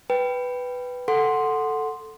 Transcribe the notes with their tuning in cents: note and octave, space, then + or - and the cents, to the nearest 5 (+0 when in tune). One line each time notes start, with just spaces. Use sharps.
B4 +5 G5 +0
A4 +0 F#5 -5 C6 +0